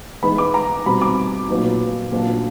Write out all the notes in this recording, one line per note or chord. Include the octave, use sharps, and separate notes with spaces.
E3 G#3 B3 D#4 B5
D6
A#5
B2 G3 C4 B5
D6
A#2 F#3 B3 D#4
A#2 F#3 A3 D4